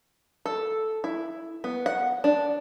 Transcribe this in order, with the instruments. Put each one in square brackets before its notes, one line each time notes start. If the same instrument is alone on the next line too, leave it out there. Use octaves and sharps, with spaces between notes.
[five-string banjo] A4
E4
B3
F#5
D4